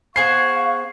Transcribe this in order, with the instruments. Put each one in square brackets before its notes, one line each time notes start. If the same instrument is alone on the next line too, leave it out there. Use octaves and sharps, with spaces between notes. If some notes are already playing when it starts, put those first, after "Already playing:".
[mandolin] B3 G#4 C5 [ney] F5 [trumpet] C#6 [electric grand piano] C7